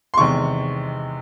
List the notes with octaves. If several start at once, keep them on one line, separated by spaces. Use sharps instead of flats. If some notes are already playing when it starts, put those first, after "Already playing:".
C6
E2 C3 D#3 G#3 C#6